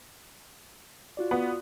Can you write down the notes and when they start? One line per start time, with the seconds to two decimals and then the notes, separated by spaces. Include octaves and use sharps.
1.17 F4 F#4 D5
1.31 B3